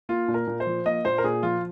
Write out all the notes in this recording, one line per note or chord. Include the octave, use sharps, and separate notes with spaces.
A#3 F4
A#2
A#4
A#2
C5
F3
A#3 D#5
A#2 C5
A#4
A#2 G#4
F3 F4